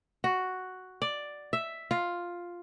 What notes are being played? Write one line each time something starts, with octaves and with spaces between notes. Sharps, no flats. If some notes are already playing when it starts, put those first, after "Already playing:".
F#4
D5
E5
F4